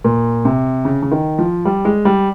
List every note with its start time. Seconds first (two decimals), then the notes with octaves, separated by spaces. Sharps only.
0.04 A#2
0.45 C3
0.85 C#3
1.02 C#3
1.11 D#3
1.39 F3
1.65 G3
1.85 G#3
2.05 G3